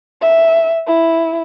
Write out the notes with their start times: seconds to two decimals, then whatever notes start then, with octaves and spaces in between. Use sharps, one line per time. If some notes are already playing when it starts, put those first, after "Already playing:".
0.21 E5
0.87 E4